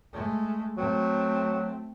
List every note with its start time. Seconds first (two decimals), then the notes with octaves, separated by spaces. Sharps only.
0.13 G#3 A3
0.77 F#3 A3 C4